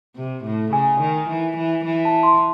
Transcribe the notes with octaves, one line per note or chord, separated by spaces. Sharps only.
C3
A2
C#3 G#5
D#3
E3
E3
E3
A5
C6